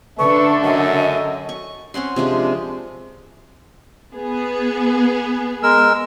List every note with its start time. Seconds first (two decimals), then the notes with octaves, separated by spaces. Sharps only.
0.19 D3 D4 A4 B4 E5 A5 C#6
0.63 F#2 D#5
1.49 C#6
1.94 C4 C#4 F#5 C6
2.16 C3 F3 G#3 D4
4.13 B3 G#4
5.63 G#3 A#4 E6